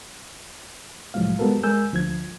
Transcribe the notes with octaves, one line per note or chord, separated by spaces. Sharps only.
C2 A2 F3 F#3 G#3 F5
G3 G#3 B3 F#4 A4 A#4
G#3 A#4 G#5 E6 G6
D2 F3 G#6